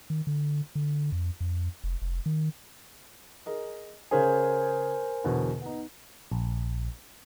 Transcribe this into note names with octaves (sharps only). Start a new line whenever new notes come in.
D#3
D3
D3
F2
F2
F1
F1
D#3
G#4 A#4 D#5
C#3 C#4 G#4 A#4 C5 G#5
E2 B2 D3
B3 D#4
A#1